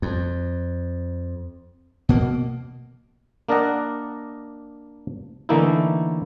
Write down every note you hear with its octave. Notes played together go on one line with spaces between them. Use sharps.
F2
B2 A#3
A#3 D4 A#4 D5 D#5 F#5
D3 E3 A3 A#3 D#4 E4